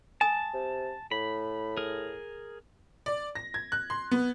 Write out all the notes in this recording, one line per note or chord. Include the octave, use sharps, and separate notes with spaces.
G#5 A5 D#6
C3
A2 B5
G#4 A#4
D5
A#6
G#6
F#6
C6
B3